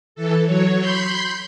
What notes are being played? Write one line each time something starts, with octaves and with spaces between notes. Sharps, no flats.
E3 A4
F#3 C#5
B5 C6 G6